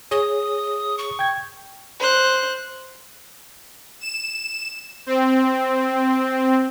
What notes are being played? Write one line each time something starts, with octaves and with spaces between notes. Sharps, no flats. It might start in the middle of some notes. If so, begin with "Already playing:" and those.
G#4 C#5 D#6
C#6
G5 G#6
C5 F#6
E7
C4